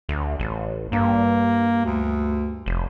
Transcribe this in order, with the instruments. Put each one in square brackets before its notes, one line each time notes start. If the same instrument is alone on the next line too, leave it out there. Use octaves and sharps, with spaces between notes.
[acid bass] D2
A1
[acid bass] G2 [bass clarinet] A#3
[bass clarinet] D2
[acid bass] F1